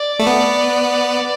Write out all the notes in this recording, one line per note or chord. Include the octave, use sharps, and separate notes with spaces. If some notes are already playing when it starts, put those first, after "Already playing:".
Already playing: D5
A3
B3